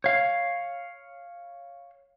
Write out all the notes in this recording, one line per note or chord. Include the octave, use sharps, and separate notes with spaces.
C#5 F5